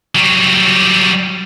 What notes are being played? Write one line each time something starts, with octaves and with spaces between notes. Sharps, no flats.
F#3 G3